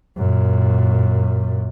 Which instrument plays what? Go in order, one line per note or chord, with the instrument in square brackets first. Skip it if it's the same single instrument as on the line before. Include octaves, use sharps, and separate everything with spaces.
[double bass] F#2 A#2